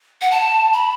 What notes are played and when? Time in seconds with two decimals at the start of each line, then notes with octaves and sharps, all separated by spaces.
0.21 F#5
0.31 A5
0.73 B5